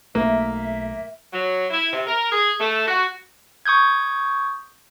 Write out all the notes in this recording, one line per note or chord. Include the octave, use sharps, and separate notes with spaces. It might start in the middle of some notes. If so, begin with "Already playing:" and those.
B1 A3 A#3 E5
F#3
E4
C3
A#4
G#4
A3
F#4
C#6 D#6 G6 G#6